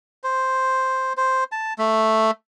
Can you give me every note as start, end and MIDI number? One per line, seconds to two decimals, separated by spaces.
0.24 1.13 72
1.17 1.44 72
1.52 1.73 81
1.78 2.31 57